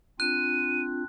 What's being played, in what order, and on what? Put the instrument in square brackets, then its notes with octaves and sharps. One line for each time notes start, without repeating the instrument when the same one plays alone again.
[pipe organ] C4 D4 F4 [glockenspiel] F#6 [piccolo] D#7